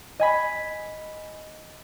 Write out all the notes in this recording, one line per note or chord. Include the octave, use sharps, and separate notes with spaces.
D#5 G#5 B5